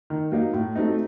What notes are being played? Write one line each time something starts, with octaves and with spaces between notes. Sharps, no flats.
D#3
F#3 A#3 D#4
A2
F#3 A3 C4 D#4